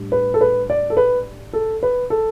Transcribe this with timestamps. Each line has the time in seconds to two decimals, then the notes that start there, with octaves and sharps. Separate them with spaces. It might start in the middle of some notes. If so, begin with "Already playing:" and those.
Already playing: A2 G3 D4
0.12 B4
0.34 A4
0.41 B4
0.70 D5
0.90 A4
0.97 B4
1.53 A4
1.83 B4
2.10 A4